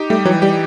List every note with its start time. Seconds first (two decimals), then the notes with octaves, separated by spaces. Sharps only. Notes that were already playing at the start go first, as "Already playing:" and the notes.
Already playing: D#4 G4
0.10 G3 A3
0.25 E3 F#3
0.42 G3 G4